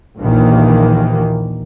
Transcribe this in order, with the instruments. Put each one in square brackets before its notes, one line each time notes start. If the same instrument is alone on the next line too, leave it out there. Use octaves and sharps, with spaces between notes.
[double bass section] A#1 D#2 A#2 D#3 E3 A#3